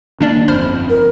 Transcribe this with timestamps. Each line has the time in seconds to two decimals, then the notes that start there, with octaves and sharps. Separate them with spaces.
0.21 D#3 A#3 C#4 D4 D5
0.48 G1 F2 C5 B5 F6
0.90 A#4